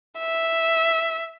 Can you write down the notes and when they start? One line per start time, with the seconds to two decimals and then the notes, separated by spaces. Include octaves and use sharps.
0.19 E5